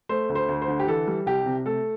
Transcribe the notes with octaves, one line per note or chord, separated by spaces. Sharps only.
A3 C5
D2
C5
D2
C5
D3
G4
E3 A4
G3
C2 G4
C3
A3 A4